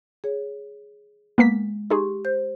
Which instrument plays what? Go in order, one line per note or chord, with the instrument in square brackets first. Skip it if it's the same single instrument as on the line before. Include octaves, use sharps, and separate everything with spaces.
[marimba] G#4 C#5
[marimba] G#3 [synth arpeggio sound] A#3 B3 B6
[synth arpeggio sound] D#4 G#4 [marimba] G4 C6 C#6
[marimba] C5 G6